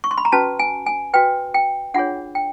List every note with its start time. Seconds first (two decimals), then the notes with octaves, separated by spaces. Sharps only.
0.04 C#6
0.11 C6
0.18 B5
0.25 A#5
0.32 C#4 F#4 B4 A5
0.59 G#5
0.86 G#5
1.14 F#4 B4 G5
1.54 G5
1.94 D4 F4 G#4 C#5 F#5
2.35 G5